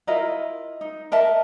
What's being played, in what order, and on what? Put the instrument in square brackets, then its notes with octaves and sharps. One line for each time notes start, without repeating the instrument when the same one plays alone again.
[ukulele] E4 F4 A#4 D#5
D#4
A#4 D#5 E5 A5